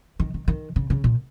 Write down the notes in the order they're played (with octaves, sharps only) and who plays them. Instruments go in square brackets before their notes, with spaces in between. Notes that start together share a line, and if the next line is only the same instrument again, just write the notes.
[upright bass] D#3
D#3
D#3
C#3
C#3
A#2